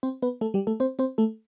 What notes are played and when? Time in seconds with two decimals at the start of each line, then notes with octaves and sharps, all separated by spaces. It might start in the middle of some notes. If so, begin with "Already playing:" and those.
0.03 C4 C5
0.22 B3 B4
0.41 A3 A4
0.54 G3 G4
0.67 A3 A4
0.80 C4 C5
0.99 C4 C5
1.18 A3 A4